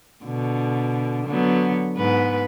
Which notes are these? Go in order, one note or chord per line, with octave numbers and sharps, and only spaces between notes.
B2 D3
D3 F#3 B3
G#2 B3 B4